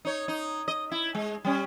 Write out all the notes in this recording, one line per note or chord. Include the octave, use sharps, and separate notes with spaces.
D#4 C#5
D#4
D#5
E4
G#3
G3 C#4